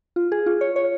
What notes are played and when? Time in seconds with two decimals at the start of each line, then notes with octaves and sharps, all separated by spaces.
0.16 F4
0.32 G#4
0.46 F4
0.61 C#5
0.76 C#5